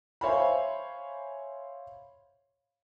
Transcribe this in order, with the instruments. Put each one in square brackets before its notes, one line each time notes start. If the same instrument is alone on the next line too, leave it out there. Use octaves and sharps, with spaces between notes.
[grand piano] C5 C#5 E5 F5 G#5 B5